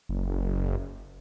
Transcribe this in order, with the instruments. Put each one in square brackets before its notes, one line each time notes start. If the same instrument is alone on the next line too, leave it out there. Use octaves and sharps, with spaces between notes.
[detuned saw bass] F#1